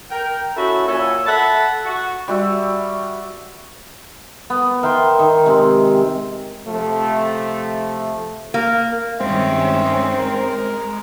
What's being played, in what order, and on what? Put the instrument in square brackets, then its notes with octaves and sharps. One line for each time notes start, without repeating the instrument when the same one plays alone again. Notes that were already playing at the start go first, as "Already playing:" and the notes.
[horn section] A#4 G5
C#4 E4 F#4 A4 E5
A#2 F#4 A4 C#5 G#5 B5
A4 E5 F#5 A5 B5
F#4
[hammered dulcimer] G3 F#4 E5
B3
A#4 E5 G5 C6
D#3
C3 G#3 C4
[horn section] C3 F3 A3
[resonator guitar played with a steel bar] A#3
[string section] G2 D#3 C#4 [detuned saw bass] G#3 [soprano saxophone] C4 [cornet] E5
[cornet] A#4